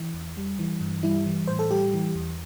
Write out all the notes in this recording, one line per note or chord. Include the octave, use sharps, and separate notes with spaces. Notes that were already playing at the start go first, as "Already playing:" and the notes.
Already playing: E3
E2
G3
E3
G2
G3 E4
E3
A2 C5
A4
G3 G4
E3
E2